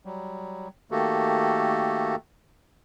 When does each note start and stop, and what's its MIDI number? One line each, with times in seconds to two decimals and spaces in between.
0.05 0.68 54
0.05 0.68 55
0.91 2.15 51
0.91 2.15 57
0.91 2.15 58
0.91 2.15 66
0.91 2.15 67
0.91 2.15 69